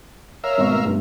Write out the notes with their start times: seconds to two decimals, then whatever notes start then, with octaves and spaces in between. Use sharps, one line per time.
0.44 A#4 C#5 E5 F5
0.58 G#1 B2 C#6
0.73 A3
0.85 G1 G2